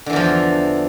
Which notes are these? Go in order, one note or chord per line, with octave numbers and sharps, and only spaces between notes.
E2 D3 E3 F3